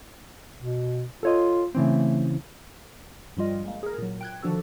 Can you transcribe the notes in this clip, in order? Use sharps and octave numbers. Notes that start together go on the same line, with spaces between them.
B2
F4 A4 C#5 D#5
C#3 E3 A3 C4
G2 F3 G3 F4 D#5
G#3 A#3
G#4 A#4
A#2 F#3
G5 F#6 G#6
D3 D#3 F3 D4 F#4 A4